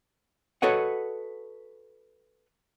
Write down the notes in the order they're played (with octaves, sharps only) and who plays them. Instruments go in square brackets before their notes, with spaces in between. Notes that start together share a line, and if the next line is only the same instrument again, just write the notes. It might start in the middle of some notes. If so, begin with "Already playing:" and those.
[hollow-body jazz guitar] F#4 A4 B4 C#5 D#5 F#5